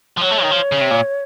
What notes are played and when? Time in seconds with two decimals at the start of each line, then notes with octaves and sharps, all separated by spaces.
0.18 F3
0.21 F#3 C#5
0.32 A3
0.43 D#3
0.51 F3
0.72 C#3
0.81 C3
0.91 A#2